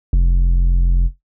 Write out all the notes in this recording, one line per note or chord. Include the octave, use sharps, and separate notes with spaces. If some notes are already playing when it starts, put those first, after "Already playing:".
F1